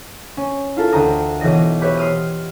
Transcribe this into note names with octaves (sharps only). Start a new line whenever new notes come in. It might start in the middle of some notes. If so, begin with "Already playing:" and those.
C#4
E4 F4 A4 A#4
D2 G5 A#5 D#6 A#6
B1 E3 D#5 A#6 D#7
G4 B4 C#5 E5
C6 D#6 F6 D#7